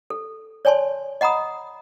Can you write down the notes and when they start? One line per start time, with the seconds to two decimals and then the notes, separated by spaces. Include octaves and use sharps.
0.10 A4
0.65 C#5 D5 G#5 A5 C6
1.21 D#5 F#5 A#5 B5 D#6